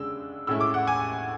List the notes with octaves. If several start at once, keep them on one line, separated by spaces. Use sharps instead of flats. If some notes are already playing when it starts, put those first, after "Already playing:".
Already playing: C#3 G#3 D4 E6
A2 G#3 C#4 E4 E6
D6
F#5
G#5